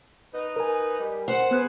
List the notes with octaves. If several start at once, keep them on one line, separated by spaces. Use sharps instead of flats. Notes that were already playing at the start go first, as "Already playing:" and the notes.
D#4 B4
A#4 G#5
G3
C5 F#5
B3 G#4 B4 F#6